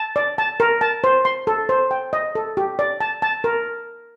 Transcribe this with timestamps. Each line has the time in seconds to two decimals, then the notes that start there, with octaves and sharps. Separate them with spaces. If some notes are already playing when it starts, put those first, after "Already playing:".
Already playing: A5
0.16 D5
0.38 A5
0.60 A#4
0.81 A5
1.04 C5
1.25 C6
1.47 A4
1.69 C5
1.91 G5
2.13 D#5
2.35 A4
2.57 G4
2.79 D5
3.01 A5
3.22 A5
3.44 A#4